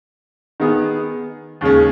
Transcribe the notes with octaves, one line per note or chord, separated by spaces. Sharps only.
D#3 B3 G#4
D#2 C#3 G#3 C#4